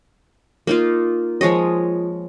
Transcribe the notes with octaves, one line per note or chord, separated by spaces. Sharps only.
A#3 D#4 F4
F3 G#3 C#5 D#5